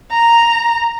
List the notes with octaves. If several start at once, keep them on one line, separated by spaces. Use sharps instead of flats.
A#5